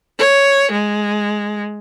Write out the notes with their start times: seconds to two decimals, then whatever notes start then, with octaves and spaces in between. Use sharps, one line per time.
0.19 C#5
0.72 G#3